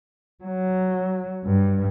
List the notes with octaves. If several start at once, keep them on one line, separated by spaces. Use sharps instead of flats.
F#3
G2